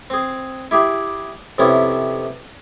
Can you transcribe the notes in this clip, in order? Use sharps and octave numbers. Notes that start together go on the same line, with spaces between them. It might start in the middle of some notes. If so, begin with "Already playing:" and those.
C4 G#4
E4 G4 G#4 B5
F2 C3 B3 C#4 E4